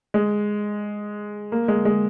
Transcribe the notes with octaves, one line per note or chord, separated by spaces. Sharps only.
G#3
A#3
G#3
G#3